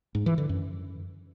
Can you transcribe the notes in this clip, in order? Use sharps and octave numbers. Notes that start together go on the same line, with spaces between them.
G#2
E3
D3
F#2